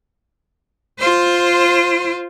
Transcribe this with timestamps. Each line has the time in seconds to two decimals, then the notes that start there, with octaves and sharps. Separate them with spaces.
0.99 F4 C5